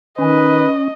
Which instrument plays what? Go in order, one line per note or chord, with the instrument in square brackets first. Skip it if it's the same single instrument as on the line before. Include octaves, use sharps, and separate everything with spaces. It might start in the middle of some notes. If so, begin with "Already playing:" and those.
[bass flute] D#3 [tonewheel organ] C#4 [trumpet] B4 [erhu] D#5